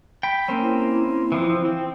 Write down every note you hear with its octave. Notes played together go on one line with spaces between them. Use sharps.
G5 B5
A#3 C4 C#4
E4
E3 F3 C4
C4